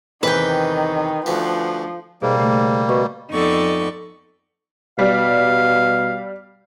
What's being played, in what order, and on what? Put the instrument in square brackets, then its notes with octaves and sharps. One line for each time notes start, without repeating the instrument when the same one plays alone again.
[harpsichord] E2 C3 [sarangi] D#3 [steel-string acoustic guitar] B4 G5
[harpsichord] D2 B3 [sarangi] F3
[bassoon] G#2 [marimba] B2 [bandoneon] G3 A#3
[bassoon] G#2 [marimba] C#3 A3
[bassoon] B2 [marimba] C#6
[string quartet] F2 B3 D#4 A4 D5 C#6
[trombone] B2 [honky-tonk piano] G3 [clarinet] F5